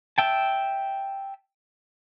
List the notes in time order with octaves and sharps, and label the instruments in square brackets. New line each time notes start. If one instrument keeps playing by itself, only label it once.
[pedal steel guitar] E5 G5 A5